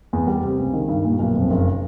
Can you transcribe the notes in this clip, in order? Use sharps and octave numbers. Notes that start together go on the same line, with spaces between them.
E2
G3
C3
C#2
D#3
G2
A#2
B1
F2
F#1